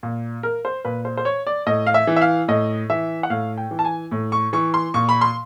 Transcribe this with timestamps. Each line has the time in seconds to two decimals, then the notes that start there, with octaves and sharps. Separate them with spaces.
0.03 A#2
0.43 A#4
0.65 C5
0.85 A#2 B4
1.05 C5
1.17 C5
1.25 C#5
1.47 D5
1.66 A2 D#5
1.86 F5
1.94 E5
2.07 E3
2.16 E5
2.21 F5
2.48 A2 D#5
2.90 E3 E5
3.23 F#5
3.30 A2 F5
3.58 G5
3.71 E3
3.79 A5
3.85 G#5
4.11 A2
4.32 C#6
4.53 E3 C#6
4.74 C6
4.94 A#2 C#6
5.09 B5
5.21 C6